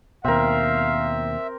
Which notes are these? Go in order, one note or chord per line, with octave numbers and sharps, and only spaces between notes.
D#2 B2 C4 A#4 E5 F5